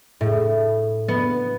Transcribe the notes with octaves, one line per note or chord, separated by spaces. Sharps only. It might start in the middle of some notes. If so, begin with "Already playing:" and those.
A2
B3